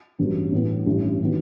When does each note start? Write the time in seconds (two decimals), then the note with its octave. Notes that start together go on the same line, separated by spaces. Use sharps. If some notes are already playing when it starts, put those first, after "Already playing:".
0.19 A1 G2 F#3 B3
0.52 A2 E3 B3
0.86 A1 G2 E3
1.23 D#3 F#3 B3